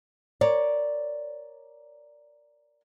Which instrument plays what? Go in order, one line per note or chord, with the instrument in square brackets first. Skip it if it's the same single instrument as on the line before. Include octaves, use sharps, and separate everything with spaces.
[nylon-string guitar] A#4 C#5 D5